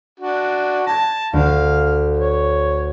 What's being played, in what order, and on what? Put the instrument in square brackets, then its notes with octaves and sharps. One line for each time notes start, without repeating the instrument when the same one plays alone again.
[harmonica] D4 F#4
[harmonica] A5 [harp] G#6 A#6
[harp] D2 [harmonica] F5
[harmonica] C#5